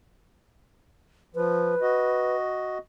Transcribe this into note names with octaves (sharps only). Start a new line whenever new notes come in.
F3 B4
F#4 D#5